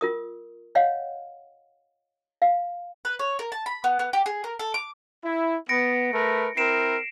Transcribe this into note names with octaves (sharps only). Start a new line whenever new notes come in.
F4 A#4 D#6
C#5 D#5 F5 F#5
F5
B4
C#5
A#4
A5
B5
B3
B3
G4
G#4
A#4
A4
D6
E4
B3 A#6 C#7 D7
A3 A#4 B4
C4 E4 A#4 C7 D7 E7